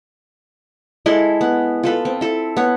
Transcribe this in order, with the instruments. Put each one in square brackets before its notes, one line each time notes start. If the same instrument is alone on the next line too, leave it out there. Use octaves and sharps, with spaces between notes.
[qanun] G#3 E4 A4 C6
B3
F4 A4 B4
C4
E4 A4
B3 C#5